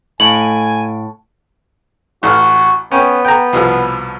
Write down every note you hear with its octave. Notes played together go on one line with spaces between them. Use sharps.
A2 A3 F5 G#5 D7 F#7
A1 F#4 F6
B3 C#4 G5
G5 A#5
C2 B2 F3